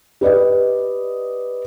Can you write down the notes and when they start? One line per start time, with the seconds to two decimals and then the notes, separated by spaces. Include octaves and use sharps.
0.21 G4 B4 D5 D#5